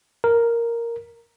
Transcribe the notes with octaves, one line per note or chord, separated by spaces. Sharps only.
A#4